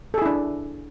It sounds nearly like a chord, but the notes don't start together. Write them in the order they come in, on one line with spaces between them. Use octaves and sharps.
A4 G#4 E4 D4